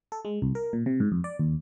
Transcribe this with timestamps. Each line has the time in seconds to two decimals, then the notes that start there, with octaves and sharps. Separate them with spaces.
0.12 A4
0.25 G#3
0.42 C2
0.55 A#4
0.73 A#2
0.86 C3
1.00 G#2
1.12 F2
1.24 D5
1.39 D#2